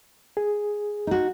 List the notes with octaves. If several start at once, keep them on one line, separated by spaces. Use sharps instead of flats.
G#4
D#4 F#4